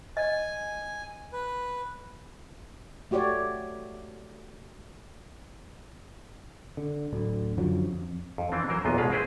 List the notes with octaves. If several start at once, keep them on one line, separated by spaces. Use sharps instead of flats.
D#5 G#5
B4
A3 F#4 G4 C#5 D5
D3
D1 D2 D3
F#2 D3 F3 F#3
F2
F2
E3 C4 D4
E3 F#3 A#4 C5
B1 E2 A#2 B3 F4 D#5
C2 B2 G#3 F4 B4 F5
C4 E4 G4 G#4 B4 C5